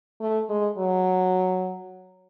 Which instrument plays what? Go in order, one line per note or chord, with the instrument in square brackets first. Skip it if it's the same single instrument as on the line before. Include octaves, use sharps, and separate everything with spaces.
[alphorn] A3
G#3
F#3